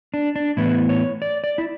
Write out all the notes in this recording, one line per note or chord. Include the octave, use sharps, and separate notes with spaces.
D4
D4
A2 E3 B3 E4
C#5
D5
D5
E4